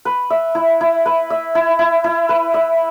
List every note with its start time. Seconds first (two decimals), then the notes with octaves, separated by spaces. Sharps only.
0.05 B4
0.30 E5
0.55 E4
0.81 E4
1.06 B4
1.30 E5
1.55 E4
1.79 E4
2.04 E4
2.29 B4
2.54 E5